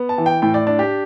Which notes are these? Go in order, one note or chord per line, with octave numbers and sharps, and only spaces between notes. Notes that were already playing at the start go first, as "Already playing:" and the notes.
Already playing: B3
A5
E3
G5
A2 G5
D5
D4 D5
G4